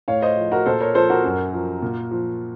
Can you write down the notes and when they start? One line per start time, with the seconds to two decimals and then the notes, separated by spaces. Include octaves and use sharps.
0.08 A2 C#5 F5
0.22 C5 D#5
0.37 F3
0.51 F#4 A#4
0.66 A#2 A4 C5
0.80 A#4 C#5
0.95 F3 A4 C5
1.10 F#4 A#4
1.24 F#2
1.53 F3
1.82 A#2
2.11 F3